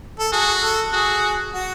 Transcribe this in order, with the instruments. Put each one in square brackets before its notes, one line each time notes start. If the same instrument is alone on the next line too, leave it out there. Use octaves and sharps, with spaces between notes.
[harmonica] A4
[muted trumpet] F#4 [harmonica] G#4
[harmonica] A4
[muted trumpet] F#4 [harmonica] G#4
[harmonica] F#4